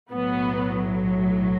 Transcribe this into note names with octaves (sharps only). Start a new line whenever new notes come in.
B1 A2 F#3 B3